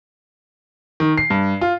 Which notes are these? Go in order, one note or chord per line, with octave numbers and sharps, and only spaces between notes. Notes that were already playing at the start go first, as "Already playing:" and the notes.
D#3
C7
G2
F4